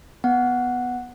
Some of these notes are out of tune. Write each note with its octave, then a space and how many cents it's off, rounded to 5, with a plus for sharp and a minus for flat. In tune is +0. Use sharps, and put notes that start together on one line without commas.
B3 +0 F#5 +0